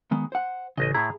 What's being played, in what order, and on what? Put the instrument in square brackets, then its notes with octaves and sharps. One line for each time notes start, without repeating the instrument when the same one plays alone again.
[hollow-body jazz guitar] D#3 G#3 B3
C5 F#5
[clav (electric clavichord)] A1 D#5 [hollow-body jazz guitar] C#3
[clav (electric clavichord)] A2 E4 [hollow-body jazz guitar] G#4 A#5